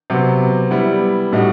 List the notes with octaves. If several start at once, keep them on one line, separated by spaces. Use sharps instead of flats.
C3 F#3 B3
G3 B3 E4
A2 G3 D#4 F#4